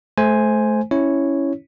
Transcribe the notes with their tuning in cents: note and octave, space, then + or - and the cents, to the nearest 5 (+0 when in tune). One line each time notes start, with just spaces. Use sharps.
A3 -25 C5 +0 G#5 +0
C#4 -5 E4 -5 C#5 -5